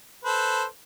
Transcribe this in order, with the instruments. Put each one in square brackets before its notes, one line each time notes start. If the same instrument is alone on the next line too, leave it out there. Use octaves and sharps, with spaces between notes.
[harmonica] A4 B4 C5